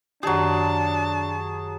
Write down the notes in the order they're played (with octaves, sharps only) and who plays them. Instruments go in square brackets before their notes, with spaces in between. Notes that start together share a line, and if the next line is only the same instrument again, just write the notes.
[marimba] F#2 D#3 G4 [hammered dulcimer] F#3 G#4 [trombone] D4 [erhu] A5